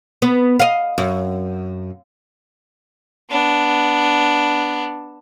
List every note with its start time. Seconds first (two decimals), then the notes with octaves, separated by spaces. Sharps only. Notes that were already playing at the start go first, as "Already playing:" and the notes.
0.22 B3
0.59 D#5 F5
0.98 F#2
3.30 B3 D4